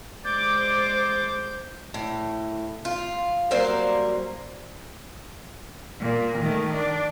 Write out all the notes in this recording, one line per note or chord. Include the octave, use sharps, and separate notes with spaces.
G#3 C5 D5 D6 G6
A2
F4
F#3 G3 A#3 C5
A#2
D#3 A3
D4